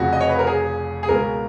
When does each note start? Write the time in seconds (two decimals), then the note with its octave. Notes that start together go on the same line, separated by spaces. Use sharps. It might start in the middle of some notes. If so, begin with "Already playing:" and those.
Already playing: F1 F2 C#3 F3 F#4
0.13 D#5
0.21 C#5
0.29 B4
0.39 A#4
0.47 G#4
1.03 G#4
1.09 C#2 B2 A#4